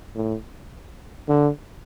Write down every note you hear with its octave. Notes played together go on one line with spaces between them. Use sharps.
A2
D3